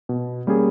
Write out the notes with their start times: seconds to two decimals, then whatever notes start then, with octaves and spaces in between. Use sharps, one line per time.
0.09 B2
0.47 G3 A#3 C#4 G#4